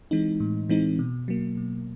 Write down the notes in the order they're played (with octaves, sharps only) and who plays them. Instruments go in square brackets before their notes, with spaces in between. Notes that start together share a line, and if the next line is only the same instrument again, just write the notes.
[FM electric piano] E3 G#3 C4 D#4
A2
E3 G#3 C4 D#4
B2
F#3 A#3
B2